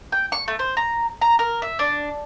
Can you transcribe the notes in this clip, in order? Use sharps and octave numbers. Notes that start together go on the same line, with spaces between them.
G5
C#6
A3
C5
A#5
A#5
A#4
E5
D4